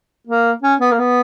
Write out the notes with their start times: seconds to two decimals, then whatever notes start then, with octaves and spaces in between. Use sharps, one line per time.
0.27 A#3
0.62 C#4
0.80 B3
0.92 A#3
0.99 B3